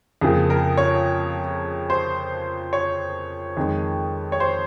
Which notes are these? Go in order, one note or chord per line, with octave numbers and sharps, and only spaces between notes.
F2 C#3 F3 A#3 G#4
A#4
C#5
C5
C#5
F2 D#3 G#3
C#5
C5